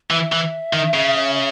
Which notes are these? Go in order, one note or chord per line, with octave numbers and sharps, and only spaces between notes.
E3 E5
E3
D#3
C#3